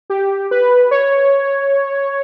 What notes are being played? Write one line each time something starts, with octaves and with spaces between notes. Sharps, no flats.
G4
B4
C#5